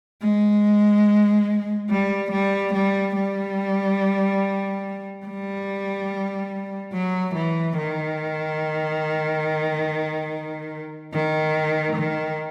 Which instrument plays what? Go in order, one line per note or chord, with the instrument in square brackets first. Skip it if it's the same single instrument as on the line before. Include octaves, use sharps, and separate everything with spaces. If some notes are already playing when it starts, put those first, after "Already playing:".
[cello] G#3
G3
G3
G3
G3
G3
F#3
E3
D#3
D#3
D#3